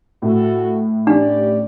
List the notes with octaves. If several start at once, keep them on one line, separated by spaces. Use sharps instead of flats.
A2 F#4 A4
C#4 D4 G4 D5